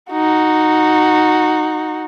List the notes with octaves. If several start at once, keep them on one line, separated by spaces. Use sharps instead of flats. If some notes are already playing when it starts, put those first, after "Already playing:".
D#4 F#4